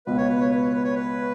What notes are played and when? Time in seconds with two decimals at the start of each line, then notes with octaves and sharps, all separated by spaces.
0.06 C#2 B2 B3 B4
0.17 C#5
0.29 B4
0.40 C#5
0.51 B4
0.62 C#5
0.72 B4
0.84 C#5
0.95 B4